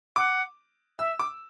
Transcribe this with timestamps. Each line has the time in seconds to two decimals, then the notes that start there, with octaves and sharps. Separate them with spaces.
0.16 F#5 D6
0.99 E5 E6
1.19 D6